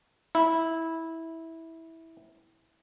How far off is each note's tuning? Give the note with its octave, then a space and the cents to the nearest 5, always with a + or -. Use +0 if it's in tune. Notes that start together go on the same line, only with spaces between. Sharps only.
E4 -15